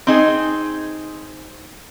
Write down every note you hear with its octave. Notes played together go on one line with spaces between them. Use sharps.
C4 D#4 G#4